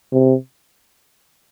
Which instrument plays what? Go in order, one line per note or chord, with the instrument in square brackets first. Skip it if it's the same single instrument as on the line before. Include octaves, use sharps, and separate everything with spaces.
[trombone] C3